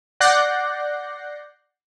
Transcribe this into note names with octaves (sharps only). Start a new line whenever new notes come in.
D5 F#5 F#6 G6 A#6 C7